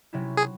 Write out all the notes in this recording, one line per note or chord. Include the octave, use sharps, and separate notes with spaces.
C3 F#3 C#4 E4
G#4